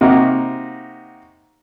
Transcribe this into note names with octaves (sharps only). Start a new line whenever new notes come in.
C3 A#3 D#4 F#4